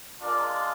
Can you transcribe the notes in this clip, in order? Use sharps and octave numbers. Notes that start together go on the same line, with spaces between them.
G#3 D4 F4 A#4 D5